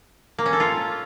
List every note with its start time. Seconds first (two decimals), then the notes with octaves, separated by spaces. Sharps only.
0.38 A#3
0.46 C#4
0.53 A4
0.60 F4